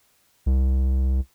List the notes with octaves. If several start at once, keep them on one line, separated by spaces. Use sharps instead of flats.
C2